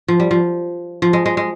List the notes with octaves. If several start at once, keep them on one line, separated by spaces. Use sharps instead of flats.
F3
G3
F3
F3
G#3
G#3
G#3